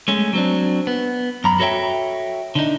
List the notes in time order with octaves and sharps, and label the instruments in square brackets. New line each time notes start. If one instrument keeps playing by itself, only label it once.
[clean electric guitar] G#3 A3 C#4
F#3 C4 D4
B3
F#2 A#5 B5
F#4 A4 C#5 D5 E5 G5
D3 D4 D#4